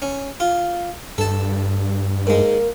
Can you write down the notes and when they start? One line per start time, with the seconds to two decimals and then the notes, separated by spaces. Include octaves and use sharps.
0.02 C#4
0.40 F4
1.18 G2 A4 A5
2.27 G#2 G#3 A#3